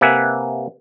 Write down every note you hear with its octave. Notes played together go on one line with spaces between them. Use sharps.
C3 A#3 B4 E5 F#5 G#5